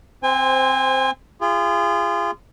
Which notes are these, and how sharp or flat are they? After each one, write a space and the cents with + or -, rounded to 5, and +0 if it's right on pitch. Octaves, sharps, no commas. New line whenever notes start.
C4 +0 C5 -10 G#5 -35
F4 -30 G#4 -30